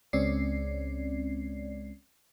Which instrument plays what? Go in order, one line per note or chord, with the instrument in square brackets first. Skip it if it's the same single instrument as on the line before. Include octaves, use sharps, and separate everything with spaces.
[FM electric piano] C#2 G#3 C4 C#4 D5 C7